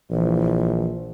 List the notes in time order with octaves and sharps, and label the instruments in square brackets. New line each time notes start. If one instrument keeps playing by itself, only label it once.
[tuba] A#1 [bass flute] E3